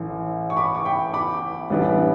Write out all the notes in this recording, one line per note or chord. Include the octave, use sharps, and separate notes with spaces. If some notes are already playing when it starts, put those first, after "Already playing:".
Already playing: A1 A2 E3
C#6
B5 D6
C#6
G5 B5
B5 D6
A1 A2 G3 B3 D4